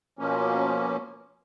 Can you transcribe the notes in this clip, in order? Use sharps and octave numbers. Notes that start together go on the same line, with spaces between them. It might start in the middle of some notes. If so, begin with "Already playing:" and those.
B2 F3 A#3 C#4